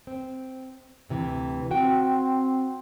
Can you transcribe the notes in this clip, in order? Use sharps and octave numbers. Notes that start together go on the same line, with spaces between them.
C4
D2 C3 E3
C4 F#4 G5